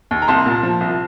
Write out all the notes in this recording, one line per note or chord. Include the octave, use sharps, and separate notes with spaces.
D#2
A#5
C2 A5 C6
A#2
F3
C2